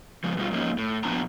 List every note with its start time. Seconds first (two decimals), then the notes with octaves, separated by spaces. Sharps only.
0.24 C#3 F3 G#3
0.37 B2 G3 F4
0.51 G#2 F3 A#3 C#4 D#4
0.78 A2
1.04 A#2 F3 B3 D4 A5 A#5